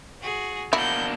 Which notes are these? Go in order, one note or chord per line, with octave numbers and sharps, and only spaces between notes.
F#4 G#4
B2 A#3 D4 E4 F#5 G6